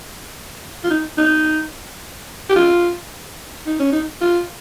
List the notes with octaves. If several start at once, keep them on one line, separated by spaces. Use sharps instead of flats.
F4
D#4
D#4
G4
F4
D#4
C#4
D#4
F4